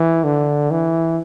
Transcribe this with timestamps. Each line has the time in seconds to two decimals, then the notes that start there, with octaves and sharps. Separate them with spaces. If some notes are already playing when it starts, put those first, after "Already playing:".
Already playing: E3
0.24 D3
0.71 E3